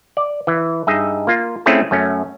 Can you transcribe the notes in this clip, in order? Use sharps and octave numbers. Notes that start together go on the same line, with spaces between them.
D5
E3
G2 D#4 G#4 D#5 E5
A#3 F4
A3 C4 C#4 E4 F4 G#4
F#2 A3 C#4